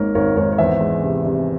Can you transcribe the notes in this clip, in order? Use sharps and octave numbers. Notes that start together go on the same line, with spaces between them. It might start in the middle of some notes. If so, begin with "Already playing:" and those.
Already playing: G#1 G#2 A#3 A#4 C#5
G#1 A#4 C#5
G#1 A#4 C#5
C#5
E2 C5 E5
G#3
C3
C3